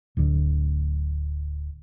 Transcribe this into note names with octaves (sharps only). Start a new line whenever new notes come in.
D1 D2 D3